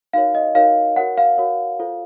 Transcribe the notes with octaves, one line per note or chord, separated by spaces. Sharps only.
D#4 F#4 A#4 C#5 F5
D#5
D#4 F#4 A#4 C#5 F5
F#4 A#4 C#5 F#5
F5
F#4 A#4 C#5
F4 A4 C5